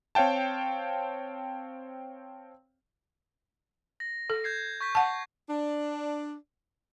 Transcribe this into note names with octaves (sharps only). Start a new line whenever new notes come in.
C4 C#5 F5 G5 A5
A#6
A4
G6 G#6 C7
C#6 G6 B6
F#5 A5
D4